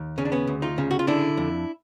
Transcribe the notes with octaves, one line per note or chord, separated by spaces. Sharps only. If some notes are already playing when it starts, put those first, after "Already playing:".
Already playing: D#2
C#3 C#4
D4
B3 C#4
D2
D#4 F4
C#3
F#4
F4
D3 D4 E4
F2